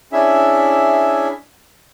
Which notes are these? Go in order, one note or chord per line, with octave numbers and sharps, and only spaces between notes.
C#4 D4 E4 G#4 E5